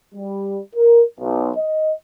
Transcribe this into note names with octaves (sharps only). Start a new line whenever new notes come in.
G3
A#4
B1
D#5